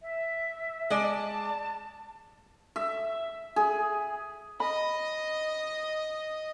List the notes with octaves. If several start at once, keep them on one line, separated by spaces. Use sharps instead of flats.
E5
G#3 D5 A5
E5
G#4
D#5 B5